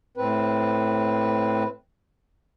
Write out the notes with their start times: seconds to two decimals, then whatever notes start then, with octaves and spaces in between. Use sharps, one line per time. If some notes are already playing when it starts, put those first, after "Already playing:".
0.17 A2 C4 B4